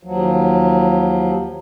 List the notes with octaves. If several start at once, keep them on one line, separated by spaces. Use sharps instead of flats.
D#2 F3 F#3